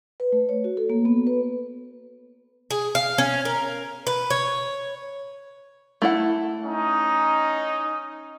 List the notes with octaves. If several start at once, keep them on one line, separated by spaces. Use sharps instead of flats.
B4
A3
C#5
F#4
A4
A#3
B3
B4
G#4
F5
C#4
A#4
B4
C#5
A3 E4 F#5
C#4 D#4